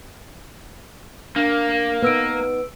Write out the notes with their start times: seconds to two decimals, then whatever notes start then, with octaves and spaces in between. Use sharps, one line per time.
1.36 A#3 D4
2.02 B3 D#4 B4 E6 D7